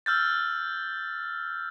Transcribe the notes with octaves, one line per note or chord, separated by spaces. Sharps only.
E6 F6 G6 A6